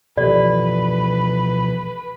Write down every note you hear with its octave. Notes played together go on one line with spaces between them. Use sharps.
B2 E3 F3 G4 A4 B4 D5